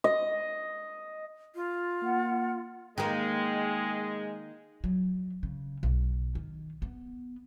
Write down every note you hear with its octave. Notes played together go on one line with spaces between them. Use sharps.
D#5
F4
A#3 F#5
D#3 G#3 A#3
F#3
C#3
B1
D#3
B3